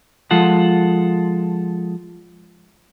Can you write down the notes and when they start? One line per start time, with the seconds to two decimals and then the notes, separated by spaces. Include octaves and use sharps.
0.31 F3 G#3 F4 A4 F#5